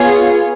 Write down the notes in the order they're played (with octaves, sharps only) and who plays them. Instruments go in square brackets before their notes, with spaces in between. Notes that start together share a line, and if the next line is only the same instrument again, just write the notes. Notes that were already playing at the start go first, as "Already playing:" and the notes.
Already playing: [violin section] B3 F4 G#4 C#5